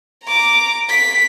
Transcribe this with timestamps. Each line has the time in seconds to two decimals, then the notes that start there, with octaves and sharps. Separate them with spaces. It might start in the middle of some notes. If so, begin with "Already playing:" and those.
0.24 A#5 D6
0.89 B6